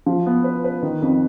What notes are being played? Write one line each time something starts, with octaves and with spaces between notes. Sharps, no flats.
F3
B3
B4
B4
D#3
F2